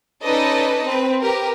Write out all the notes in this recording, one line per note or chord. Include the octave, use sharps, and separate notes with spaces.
C#4 D#4 A4 B4 D5 D#5
C4 B4
G4 A#4 B4